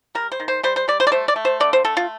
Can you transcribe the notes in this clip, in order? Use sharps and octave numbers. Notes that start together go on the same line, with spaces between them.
G3 A#4
C5
D#3
C5
G3 C5
C5
G3 D5
C5
D5
A3 C5
D5
A3
C5
D3 D5
C5
A3 A4
F4